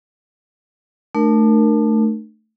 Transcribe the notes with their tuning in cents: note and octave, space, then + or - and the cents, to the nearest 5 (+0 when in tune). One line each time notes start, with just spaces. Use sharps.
A3 +0 D4 +35 A#4 +0